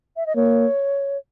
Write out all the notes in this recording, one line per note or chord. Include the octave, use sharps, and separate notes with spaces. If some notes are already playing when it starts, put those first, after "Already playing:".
E5
D#5
A#3 C#5